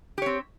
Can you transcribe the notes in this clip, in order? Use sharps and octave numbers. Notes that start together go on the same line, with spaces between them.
C4 G4 C#5